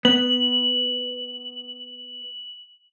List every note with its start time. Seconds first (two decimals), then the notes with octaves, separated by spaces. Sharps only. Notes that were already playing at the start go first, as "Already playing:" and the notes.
0.05 B3 F#7